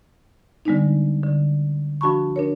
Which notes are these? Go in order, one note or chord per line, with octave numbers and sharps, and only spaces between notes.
D3 G3 G#3 B3 D4 D#4
D3
F3 D4 F#4 A5 B5 C#6
D4 A#4 C#5